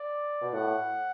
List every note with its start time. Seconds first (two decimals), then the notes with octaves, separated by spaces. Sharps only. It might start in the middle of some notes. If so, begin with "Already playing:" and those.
Already playing: D5
0.42 B2
0.53 A2 F#5